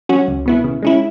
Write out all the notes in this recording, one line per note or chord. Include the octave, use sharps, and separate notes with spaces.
F#3 C#4 F#4
C#2
B2 B3 E4
C#3
G#3 C#4 E4